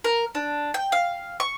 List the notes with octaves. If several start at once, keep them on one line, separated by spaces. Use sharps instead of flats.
A#4
D4
G5
F5
C#6